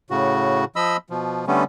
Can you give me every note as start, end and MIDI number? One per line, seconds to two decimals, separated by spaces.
0.10 0.65 45
0.10 0.65 49
0.10 0.65 66
0.76 0.97 53
0.76 0.97 75
0.76 0.97 83
0.76 0.97 88
1.10 1.45 47
1.10 1.45 53
1.47 1.64 50
1.47 1.64 55
1.47 1.64 57
1.47 1.64 59
1.47 1.64 61